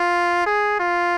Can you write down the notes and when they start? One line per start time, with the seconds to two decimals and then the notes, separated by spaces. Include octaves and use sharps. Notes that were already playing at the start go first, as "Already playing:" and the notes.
Already playing: F4
0.46 G#4
0.79 F4